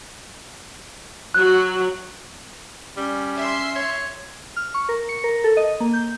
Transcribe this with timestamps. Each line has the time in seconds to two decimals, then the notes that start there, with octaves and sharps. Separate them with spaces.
1.34 F#3 F#4 F#6
2.97 G3 C#4
3.37 E5 C6
3.76 C#5
4.56 F6
4.74 C#6
4.89 A#4
5.09 C#7
5.24 A#4
5.44 A4
5.57 D#5
5.80 A#3
5.93 G6